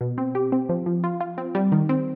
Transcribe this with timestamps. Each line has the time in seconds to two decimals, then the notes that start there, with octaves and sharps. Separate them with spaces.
0.01 B2
0.18 C4
0.35 G4
0.52 C4
0.69 F3
0.86 F3
1.04 F4
1.21 F4
1.38 C4
1.55 G3
1.72 D#3
1.89 C4